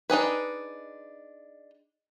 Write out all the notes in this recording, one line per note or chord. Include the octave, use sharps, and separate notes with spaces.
D4 D#4 G#4 B4